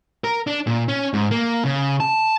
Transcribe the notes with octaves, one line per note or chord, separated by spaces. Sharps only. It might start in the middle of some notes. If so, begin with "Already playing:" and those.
A#4
D4
A#2
C#4
G#2
A#3
C#3
A5